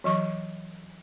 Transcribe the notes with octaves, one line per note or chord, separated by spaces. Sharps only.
E3 F#3 C#6 D6